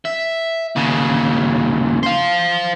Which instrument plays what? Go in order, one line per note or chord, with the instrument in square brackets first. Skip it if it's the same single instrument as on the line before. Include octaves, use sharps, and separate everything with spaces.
[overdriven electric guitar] E5
D#2 C#3
C5 F5